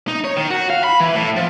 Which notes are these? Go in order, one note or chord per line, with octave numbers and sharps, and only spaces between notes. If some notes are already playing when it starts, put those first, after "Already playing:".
D#4
C#5
D#3
F#4
F5
B5
E3
A2
F3